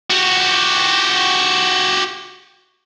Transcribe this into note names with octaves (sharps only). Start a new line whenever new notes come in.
F#4 G4